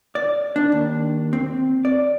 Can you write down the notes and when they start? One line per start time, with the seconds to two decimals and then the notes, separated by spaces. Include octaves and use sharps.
0.15 D5
0.56 D4
0.72 D#2
1.33 C4
1.85 D5